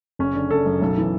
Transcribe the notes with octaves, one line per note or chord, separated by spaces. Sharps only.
F#1 C#4
D3
F#1 A4
F#2
B1
E3